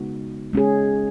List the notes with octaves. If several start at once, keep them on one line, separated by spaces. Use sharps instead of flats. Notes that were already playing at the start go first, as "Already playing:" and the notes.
Already playing: C#3 G#3 B3 D#4 F#4
G#3 C#4 G#4